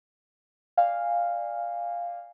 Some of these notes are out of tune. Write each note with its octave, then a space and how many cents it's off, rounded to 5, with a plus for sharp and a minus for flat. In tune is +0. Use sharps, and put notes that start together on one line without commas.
D5 +5 F5 +0 G#5 -25